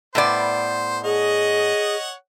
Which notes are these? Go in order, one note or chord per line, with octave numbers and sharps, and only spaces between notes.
A2 B3 C5 D5
G#4 C#5 D#5 F#5